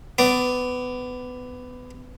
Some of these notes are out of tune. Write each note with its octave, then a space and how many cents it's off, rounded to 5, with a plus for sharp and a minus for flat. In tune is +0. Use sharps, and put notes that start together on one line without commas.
B3 +20 D5 +0